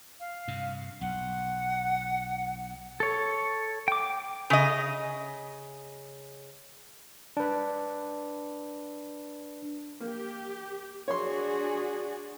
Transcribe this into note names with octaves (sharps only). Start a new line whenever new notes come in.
F5
G2 C3
B1 F#5
A4 C#5
G5 D6
C#3 D#5
D4 B4
A#3 G4
D4 F#4 G#4 C#5 C6